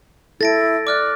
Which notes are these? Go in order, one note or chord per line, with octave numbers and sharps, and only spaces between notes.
E4 A4 A6 A#6 D7
D5 D6 F6 F#6